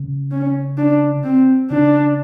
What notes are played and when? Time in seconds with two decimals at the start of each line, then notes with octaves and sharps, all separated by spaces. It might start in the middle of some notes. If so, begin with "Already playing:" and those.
Already playing: C#3
0.31 C#4
0.78 D4
1.24 C4
1.70 C#3 D4